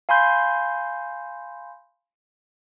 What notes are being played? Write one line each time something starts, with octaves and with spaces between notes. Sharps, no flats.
F5 G#5 B5 C6 G6